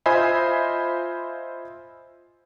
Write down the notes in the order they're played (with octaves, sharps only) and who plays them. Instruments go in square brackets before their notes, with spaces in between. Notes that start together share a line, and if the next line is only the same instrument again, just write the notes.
[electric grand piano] F4 C5 D#5 E5 G#5 B5